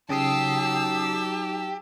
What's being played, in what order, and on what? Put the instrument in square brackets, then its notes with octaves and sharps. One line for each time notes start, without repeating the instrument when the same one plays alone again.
[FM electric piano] C#3 D#6 C7 [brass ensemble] F#3 D#4 [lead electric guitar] G4 [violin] A5 E6